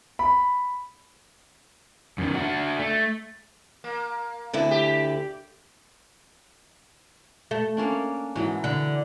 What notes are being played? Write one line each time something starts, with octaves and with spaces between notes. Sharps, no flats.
B5
F#2 D#3
D4 F#4
A3
A#3
D2 D3 E4
G4
A3
A#3 C#4 D4
G#2 E3 F#3 B5
D3